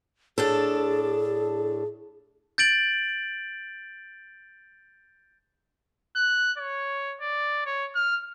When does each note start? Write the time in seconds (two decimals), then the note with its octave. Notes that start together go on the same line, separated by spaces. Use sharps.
0.38 A2 D4 G#4 A4
2.58 G6 A6 D7 F#7
6.16 F#6
6.58 C#5
7.21 D5
7.66 C#5
7.95 F6